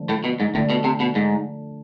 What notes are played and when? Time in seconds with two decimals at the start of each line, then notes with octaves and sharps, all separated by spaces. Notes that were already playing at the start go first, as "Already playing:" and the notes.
Already playing: D3 F3 A3 D4
0.09 A2
0.24 B2
0.40 G#2
0.54 A2 D3 A3 D4
0.70 B2
0.84 C3
1.00 B2
1.15 G#2